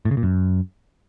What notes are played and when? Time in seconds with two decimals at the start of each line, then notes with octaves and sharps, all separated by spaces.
0.05 A2
0.11 C#3
0.17 A#2
0.23 F#2